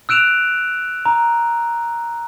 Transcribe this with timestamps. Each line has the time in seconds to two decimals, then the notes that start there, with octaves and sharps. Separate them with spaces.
0.09 E6 F#6 D7 E7 F7
1.06 A#5